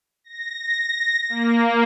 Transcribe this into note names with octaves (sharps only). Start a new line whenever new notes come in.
A#6
A#3